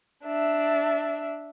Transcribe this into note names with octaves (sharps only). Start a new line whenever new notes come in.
D4 E5